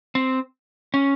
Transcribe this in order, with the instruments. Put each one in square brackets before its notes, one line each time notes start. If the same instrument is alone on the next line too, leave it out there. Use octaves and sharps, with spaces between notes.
[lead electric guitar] C4
C#4